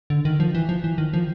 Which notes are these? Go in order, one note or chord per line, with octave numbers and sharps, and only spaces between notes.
D3
D#3
F3
E3
F3
E3
D#3
F3